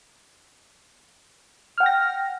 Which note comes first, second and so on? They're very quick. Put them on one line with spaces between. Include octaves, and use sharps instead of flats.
F6 F#5 G5 A#6